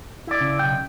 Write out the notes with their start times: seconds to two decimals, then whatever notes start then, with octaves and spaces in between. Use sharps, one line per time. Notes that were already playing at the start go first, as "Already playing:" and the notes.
0.27 E4 D5
0.41 C#3
0.59 B1 G5